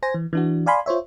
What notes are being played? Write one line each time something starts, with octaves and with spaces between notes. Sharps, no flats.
C5 G#5 A#6
E3
E3 D4 F#4
D5 F5 G#5 B5 C6
F4 C5 C#5 E5